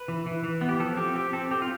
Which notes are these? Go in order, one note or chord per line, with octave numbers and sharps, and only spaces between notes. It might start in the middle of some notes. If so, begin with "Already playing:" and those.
Already playing: B4
E3
E3
E3
B3
G4
F3 A4
C4 G4
C4 G4
C4 A4
C4 G4
F4